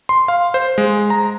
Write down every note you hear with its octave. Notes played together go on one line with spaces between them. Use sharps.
C6
F5
C5
G#3
A#5